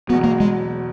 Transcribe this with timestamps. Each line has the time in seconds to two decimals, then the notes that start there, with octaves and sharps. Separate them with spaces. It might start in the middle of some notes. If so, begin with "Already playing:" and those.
0.09 E1 E2 B2 F#3 B3
0.24 A#3
0.40 G#3